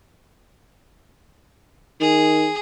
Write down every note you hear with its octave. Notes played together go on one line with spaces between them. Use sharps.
D#3 G#4